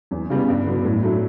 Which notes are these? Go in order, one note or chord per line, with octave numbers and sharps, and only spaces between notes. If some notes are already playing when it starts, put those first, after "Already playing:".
E2
C#3 G3 B3
G2
D3 F#3 B3
A2
F#3 A3 D4